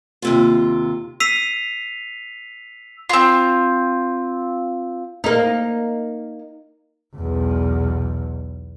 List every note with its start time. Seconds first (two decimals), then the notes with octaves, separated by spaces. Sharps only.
0.22 D#2 C3 F4
1.20 E6 B6 C7 D#7 F7
3.09 C4 F4
5.24 A#3 D#4
7.16 B1 E2